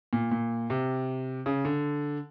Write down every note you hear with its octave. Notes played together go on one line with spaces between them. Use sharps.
A#2
A#2
C3
C#3
D3